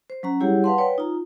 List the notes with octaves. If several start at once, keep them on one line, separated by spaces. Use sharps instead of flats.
C5
F#3 C#4 A#5
G3 E4 G4 G#4 C#5 F#5
B4 F5 F#5 A5 C6
B4 C#5 D5 G5
D#4 F4 A#5